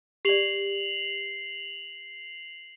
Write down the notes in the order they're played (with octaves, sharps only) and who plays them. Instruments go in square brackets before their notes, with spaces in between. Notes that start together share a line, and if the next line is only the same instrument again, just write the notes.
[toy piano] G4 D5 [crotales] C7 F7 F#7